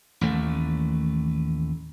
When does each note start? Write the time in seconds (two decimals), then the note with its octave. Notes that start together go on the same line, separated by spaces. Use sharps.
0.21 A1 D#2 A3